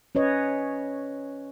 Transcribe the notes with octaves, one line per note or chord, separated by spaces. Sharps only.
C#4 B4 C#5 D#5